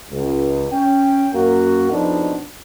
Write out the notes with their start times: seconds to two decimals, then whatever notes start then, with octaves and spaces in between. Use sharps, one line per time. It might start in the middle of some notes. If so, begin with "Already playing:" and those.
0.11 C#2
0.72 C#4 G5
1.33 F#2 A#3 F#4
1.90 F2 B2 C4 D4 D#4